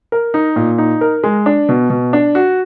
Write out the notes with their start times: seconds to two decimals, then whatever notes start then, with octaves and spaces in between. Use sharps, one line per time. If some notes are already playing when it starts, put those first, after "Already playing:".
0.12 A#4
0.34 D#4
0.56 A#2
0.78 D#4
1.01 A#4
1.24 G#3
1.46 D4
1.69 B2
1.90 B2
2.13 D4
2.35 F#4